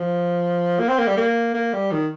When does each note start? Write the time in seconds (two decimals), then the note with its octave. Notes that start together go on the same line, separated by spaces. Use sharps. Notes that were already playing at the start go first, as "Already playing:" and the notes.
Already playing: F3
0.80 A#3
0.89 C4
0.99 A#3
1.08 G3
1.17 A#3
1.54 A#3
1.73 G3
1.92 D#3